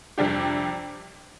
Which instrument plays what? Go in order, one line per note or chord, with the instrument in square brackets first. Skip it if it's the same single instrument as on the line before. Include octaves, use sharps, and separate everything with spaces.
[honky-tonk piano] F2 C3 G3 D4 G4